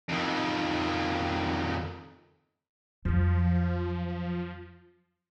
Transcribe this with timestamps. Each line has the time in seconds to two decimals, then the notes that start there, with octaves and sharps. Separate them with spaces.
0.09 F2 D#3
3.05 F2 F3 F#3